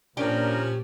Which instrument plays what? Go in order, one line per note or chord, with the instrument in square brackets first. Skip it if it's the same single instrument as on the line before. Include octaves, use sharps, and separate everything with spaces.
[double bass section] A#2 [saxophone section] F3 C#4 [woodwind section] D4 A#4 [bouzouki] G4